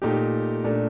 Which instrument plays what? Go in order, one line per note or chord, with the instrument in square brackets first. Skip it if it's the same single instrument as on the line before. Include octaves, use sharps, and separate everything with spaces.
[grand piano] A#2 A3 D#4 G4
A#2 A3 D4